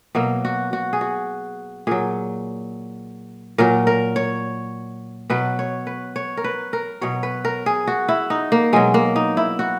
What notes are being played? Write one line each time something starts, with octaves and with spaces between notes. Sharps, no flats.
B2 F#3 A#3
F#4
F#4
G#4
F#4
A#2 F#3 G#4
A#2 F#3 A#4
A#4
C#5
B2 F#3 B4
C#5
B4
C#5
A#4
B4
A#4
B2 F#3 C#5
B4
A#4
G#4
F#4
E4
D#4
A#3
B2 F#3 G#3
A#3
D#4
E4
F#4